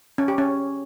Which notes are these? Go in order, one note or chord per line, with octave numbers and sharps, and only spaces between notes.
C#4
G4
C#4